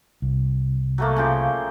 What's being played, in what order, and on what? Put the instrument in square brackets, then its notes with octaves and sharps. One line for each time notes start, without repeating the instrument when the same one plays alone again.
[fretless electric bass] C2
[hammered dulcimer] F#3 A3 A#3
C#3 F3 G5